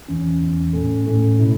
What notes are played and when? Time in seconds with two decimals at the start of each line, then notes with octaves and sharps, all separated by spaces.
0.09 E2 E3 C#4
0.41 E2 E3 C#4
0.73 A2 A3 C#4 A4
1.06 A2 A3 C#4 A4
1.39 B2 A3 E4